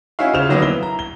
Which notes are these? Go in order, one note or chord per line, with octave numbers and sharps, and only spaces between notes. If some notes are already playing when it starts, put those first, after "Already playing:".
C#4 D#4 E4 F#4 E5 F5
C#3 F4 C5 E7 F7
D3 D#3 F#3 A#3 B3
E4 G7
A#5
G7